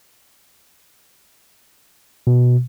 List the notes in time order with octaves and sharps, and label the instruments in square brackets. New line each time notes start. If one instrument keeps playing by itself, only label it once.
[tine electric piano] B2